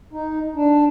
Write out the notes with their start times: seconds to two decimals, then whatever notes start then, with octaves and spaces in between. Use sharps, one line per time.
0.13 D#4
0.56 D4